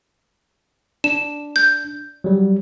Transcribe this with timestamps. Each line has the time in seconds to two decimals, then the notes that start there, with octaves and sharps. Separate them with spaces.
1.04 D4 E7
1.56 G6
2.24 F#3 G3